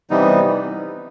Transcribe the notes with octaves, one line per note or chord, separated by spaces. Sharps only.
C3 E3 G3 B3 D#4